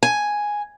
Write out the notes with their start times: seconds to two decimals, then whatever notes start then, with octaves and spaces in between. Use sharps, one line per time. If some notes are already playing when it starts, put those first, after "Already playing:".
0.03 G#5